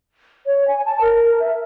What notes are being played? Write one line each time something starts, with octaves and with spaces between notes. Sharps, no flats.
C#5
G#5
A5
A#4
E5